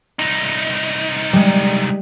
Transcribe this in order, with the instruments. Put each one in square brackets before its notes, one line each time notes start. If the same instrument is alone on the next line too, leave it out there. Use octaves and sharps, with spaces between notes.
[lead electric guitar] C2 D#4
[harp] G3 G#3